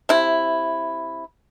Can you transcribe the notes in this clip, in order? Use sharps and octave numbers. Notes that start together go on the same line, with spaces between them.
C3 E4